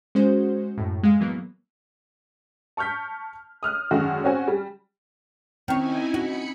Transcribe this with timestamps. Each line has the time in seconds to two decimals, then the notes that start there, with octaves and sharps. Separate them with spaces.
0.15 G#3 C#4 F#4 C5
0.78 F#2 A2
1.03 G#3 F5
1.20 E3 F#3 A#3 B3
2.77 A5 C#6 F6 G6 B6
3.63 D#6 F6 F#6
3.91 F#2 D3 D#3 G#3 F#4
4.24 C4 C#4 F#4 G#5
4.48 G3
5.68 D#3 C4 C#4 D#4 E4 C#5 G#5
6.14 D#4 F#4 B5 C#7